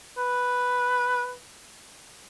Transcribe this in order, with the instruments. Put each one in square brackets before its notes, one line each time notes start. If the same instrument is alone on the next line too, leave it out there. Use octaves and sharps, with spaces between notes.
[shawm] B4